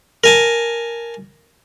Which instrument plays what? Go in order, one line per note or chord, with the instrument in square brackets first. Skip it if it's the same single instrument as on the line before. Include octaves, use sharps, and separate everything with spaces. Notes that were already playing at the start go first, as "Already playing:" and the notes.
[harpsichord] A#4 G#5 A5